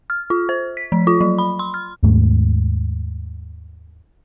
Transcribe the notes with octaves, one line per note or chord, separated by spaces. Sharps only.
F6
F4
C5
B6
F3
F4
F#3
B5
C6
F6
D#2 G#2 A3